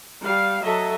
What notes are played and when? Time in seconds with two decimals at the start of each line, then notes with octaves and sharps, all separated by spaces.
0.22 G3 F5
0.62 F#3 A4 D#5 E5